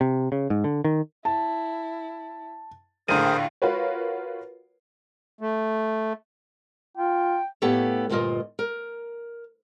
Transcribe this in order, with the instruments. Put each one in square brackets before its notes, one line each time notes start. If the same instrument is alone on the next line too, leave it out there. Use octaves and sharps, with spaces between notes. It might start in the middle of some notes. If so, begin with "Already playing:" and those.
[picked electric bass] C3
C#3
G#2
D3
D#3
[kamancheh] E4 [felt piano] A5
[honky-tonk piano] A#1 A2 D3 [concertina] G#4 A#4 C5 [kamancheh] F5 [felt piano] D#7
[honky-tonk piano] F4 F#4 A#4 B4 C#5
[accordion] A3
[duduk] F4 [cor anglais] G5
[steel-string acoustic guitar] A2 A#3 B3 G4 A4 C#5
D2 G2 A#2 F4 A#4 D#5
A#4